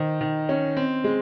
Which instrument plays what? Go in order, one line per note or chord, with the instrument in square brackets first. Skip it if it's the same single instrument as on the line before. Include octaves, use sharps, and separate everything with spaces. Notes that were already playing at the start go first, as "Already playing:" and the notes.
Already playing: [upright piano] D#3 [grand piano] C5 D#5
[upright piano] D#3
C#4
C4
G#3